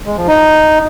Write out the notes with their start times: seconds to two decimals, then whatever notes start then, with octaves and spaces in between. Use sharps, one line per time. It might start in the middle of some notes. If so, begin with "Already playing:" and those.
0.06 G#3
0.17 F3
0.27 D#4